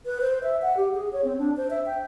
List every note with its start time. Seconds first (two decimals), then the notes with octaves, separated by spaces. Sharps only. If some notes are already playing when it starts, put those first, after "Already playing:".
0.06 B4
0.21 C5
0.43 E5
0.62 F#5
0.77 G4
0.94 G#4
1.13 C#5
1.24 C4
1.39 D4
1.57 C5
1.70 E5
1.86 G5